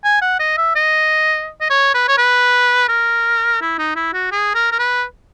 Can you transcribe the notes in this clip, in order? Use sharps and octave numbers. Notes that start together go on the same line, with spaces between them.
G#5
F#5
D#5
E5
D#5
D#5
C#5
B4
C#5
B4
A#4
E4
D#4
E4
F#4
G#4
A#4
A#4
B4